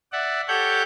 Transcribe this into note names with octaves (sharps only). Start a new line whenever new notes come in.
D5 E5 F#5
G4 A4 C#5 F#5 F#6 G6